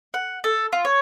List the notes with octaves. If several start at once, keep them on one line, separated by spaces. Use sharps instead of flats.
F#5
A4
F4
C#5